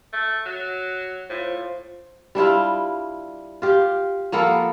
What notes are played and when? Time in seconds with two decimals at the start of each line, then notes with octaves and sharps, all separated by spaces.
0.13 A3
0.46 F#3
1.30 A2 F4 C5
2.35 G3 D4 E4 F4
3.62 F4 G4
4.32 F3 A#3 B3 A4